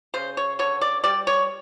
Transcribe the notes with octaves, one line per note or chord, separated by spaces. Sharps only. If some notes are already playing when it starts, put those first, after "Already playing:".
C#3 C5
C#5
D3 C#5
D5
G3 D5
C#5